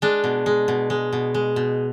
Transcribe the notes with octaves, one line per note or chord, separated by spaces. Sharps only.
G#3 D4
B2
G#3
B2
G#3
B2
G#3
B2